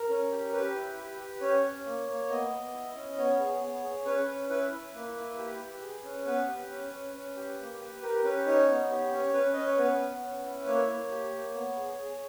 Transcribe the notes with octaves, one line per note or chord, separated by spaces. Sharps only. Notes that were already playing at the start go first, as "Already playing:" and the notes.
Already playing: A#4
C#4
G4
G4 B4
E4
G4
G4
C#4 C#5
C#4
A#3
A#3
B3 D#5
B3
E4
C#4
B3 C#5
G#4
B3
G#4
C#4 B4
C#4
E4 B4
E4
A#3
E4
G4
G4
G#4
C#4
B3 B4
G4
C#4
C#4
C#4
G4
A#3
G4
G4 A#4
C#4 B4
D#4 C#5
B3
G4
C#4
C#4 B4
C#4 D#5
C#5
B3 B4
B3
C#4
E4
A#3 C#5
A#3
G4
A#3
B3
G#4
G#4